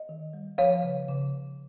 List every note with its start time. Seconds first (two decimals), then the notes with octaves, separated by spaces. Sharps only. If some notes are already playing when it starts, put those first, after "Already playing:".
Already playing: D#5
0.09 D#3
0.33 G3
0.58 F3 C#5 F5
0.83 C#3
1.09 C#3